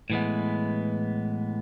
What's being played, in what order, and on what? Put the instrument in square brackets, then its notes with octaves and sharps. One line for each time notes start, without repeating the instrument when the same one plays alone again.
[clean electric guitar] A2 E3 G#3 B3